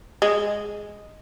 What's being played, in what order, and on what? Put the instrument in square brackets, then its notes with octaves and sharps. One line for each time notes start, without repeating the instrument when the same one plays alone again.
[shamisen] G#3